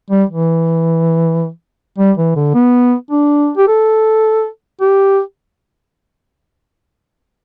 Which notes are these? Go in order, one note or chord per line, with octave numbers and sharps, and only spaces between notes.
G3
E3
G3
E3
D3
B3
D4
G4
A4
G4